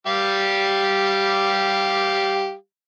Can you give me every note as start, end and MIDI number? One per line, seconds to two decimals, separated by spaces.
0.07 2.54 55
0.07 2.54 67
0.07 2.54 77